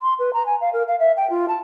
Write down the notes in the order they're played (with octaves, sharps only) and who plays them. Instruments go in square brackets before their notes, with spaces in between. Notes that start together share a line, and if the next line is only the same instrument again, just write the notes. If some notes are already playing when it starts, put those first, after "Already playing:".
[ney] C6
B4
A#5
G#5
F5
A#4
F5
E5
G5
F4
A5